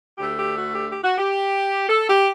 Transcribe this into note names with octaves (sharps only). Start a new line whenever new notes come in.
D2 D3 A3 G4
G4
F#4
G4
G4
F#4
G4
A4
G4